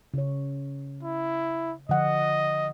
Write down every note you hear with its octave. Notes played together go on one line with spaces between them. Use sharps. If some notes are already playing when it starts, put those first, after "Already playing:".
C#3 C#5
E4
D3 F3 D#5 F#5